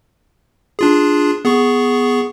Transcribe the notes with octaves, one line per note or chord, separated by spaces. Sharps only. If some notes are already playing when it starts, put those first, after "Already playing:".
D4 F4 G#4
B3 G#4 C#6